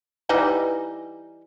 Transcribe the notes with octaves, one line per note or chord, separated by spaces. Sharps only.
E3 G3 D#4